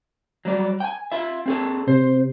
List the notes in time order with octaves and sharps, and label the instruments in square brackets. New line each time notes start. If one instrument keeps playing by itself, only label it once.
[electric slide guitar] F#3 G3 D5
G5 G#5
F4 E5
C4 G#4 A4
[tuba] C3 [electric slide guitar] C5